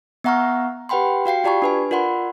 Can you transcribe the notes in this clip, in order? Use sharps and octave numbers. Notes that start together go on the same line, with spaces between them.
B3 E5 F#5 A#5 C#6 F6
G4 B4 F#5 G5 B5 C6
F#4 F5 G5 C7
F4 G4 D5 A5 B5 C#6
D4 B4 G#5
F4 A#4 D5 F#5 B5 C6